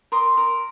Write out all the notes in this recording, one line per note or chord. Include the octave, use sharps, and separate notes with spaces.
A#4 C6 D#6
A#4